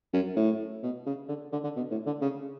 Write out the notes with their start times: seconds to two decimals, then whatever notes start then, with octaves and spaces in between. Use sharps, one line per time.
0.14 F#2
0.36 A2
0.83 B2
1.06 C#3
1.29 D3
1.52 D3
1.64 D3
1.76 B2
1.91 A2
2.06 D3
2.21 C#3